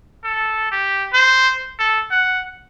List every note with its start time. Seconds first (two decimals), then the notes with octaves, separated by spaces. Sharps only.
0.24 A4
0.71 G4
1.13 C5
1.79 A4
2.11 F#5